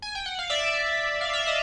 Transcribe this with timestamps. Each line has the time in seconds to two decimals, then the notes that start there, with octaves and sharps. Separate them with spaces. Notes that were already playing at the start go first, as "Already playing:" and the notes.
0.02 G#5
0.15 G5
0.26 F#5
0.39 F5
0.50 D5 E5
1.21 F5
1.33 E5
1.46 D#5 F5